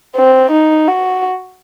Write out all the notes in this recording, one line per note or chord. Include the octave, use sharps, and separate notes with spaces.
C4
D#4
F#4